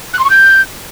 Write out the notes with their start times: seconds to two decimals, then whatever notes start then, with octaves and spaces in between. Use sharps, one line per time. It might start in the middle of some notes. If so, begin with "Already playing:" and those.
0.13 F#6
0.19 C6
0.24 C#6
0.30 G6